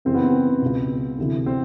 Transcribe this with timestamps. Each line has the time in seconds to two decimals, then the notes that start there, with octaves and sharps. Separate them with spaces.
0.05 F#2 C#3 E3 C4
0.14 B3
0.24 C4
0.62 C#2 B2
1.18 D2 C3 E3
1.46 C4